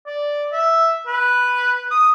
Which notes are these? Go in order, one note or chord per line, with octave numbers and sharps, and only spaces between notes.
D5
E5
B4
D#6